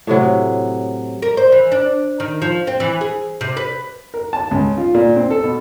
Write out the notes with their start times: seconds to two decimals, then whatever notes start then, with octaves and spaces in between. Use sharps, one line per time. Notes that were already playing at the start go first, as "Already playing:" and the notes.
0.07 A2 C3 F#3
1.22 A#4
1.37 C5
1.52 E3
1.72 D4
2.20 D#3
2.42 F3
2.67 C4
2.80 E3
3.01 G#4
3.41 C3
3.57 B4
4.14 A#4
4.33 A5
4.51 C#2
4.78 F4
4.94 A#2
5.16 C4
5.31 A4
5.44 B2